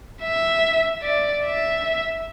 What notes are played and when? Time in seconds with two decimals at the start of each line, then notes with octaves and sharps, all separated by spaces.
0.23 E5
1.03 D5
1.45 E5